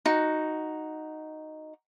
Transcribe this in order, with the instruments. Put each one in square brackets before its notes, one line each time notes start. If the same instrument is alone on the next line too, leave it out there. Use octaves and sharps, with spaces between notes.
[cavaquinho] D#4 F#4